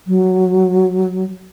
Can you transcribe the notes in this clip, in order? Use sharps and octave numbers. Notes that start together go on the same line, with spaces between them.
F#3